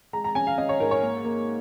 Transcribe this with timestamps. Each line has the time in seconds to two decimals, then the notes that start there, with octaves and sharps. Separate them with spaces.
0.13 G#3 A#5
0.24 A#5
0.35 C#4 G#5
0.47 F5
0.58 C#4 D#5
0.69 C#5
0.80 G#2 A#4
0.91 C#5
1.02 A#3
1.24 A#3